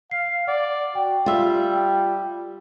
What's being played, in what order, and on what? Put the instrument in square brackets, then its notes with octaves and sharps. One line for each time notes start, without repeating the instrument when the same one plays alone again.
[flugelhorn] F5 [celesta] C7
[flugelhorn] D5 [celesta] F#5
[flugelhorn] F#4 [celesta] G5
[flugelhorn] G3 [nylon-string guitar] F4 E5
[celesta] G5